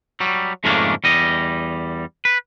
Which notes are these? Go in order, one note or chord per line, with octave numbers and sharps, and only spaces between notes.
F#3 G3
F2 G#2 C#3 A3 A#3 D4
E2 G3 D#5
B4